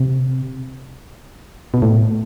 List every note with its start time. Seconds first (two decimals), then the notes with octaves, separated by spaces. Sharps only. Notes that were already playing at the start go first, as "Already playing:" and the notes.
Already playing: C3
1.74 B2
1.82 A2